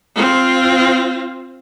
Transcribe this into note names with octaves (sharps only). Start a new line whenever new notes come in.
C4 F4